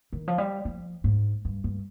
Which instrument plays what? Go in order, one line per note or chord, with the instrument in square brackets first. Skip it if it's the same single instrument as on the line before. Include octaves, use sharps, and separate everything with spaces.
[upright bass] D#3
F3
G3
F3
G#2
G2
G2